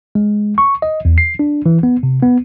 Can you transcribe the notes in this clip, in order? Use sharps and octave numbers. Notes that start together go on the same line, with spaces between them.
G#3
C#6
D#5
E2
C7
D4
E3
B3
C3
B3